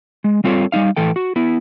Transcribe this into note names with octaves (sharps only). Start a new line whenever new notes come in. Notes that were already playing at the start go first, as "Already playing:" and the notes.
G#3
G3 C4 F4 A4 C#5
G3 G#3 D#4 F5
A2 E3 A4 G5
F#4
B3 E4